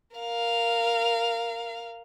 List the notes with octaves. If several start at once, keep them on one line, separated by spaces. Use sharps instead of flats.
A#4 F5